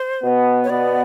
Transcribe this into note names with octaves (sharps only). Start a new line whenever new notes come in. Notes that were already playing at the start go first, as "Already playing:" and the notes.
Already playing: C5
B2 B3
C#5
B2 B3 D5